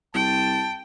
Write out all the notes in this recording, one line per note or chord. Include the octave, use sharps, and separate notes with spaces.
C2 G5 A5